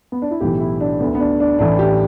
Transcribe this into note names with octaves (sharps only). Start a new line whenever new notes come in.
B3
D4
E4
B1 A2 E3 G4
E4
D4
D2 D3 B3
B3
D4
D4
A1 A2 E3 D4
G4